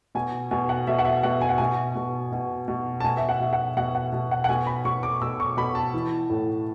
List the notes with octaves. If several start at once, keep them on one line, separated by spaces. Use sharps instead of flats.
B2 G#5
B2 G#5
F#5
B2 E5
F#5
E5
B2 F#5
G#5
F#5
B2 G#5
B2
B2
B2
A5
B2 G#5
E5
F#5
B2
F#5
B2 F#5
F#5
B2
F#5
F#5
B2 G#5
B5
B2 C#6
D6
B2 E6
C#6
B2 B5
A5
E3
A2